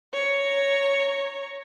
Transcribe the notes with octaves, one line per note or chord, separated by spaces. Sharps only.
C#5 A#5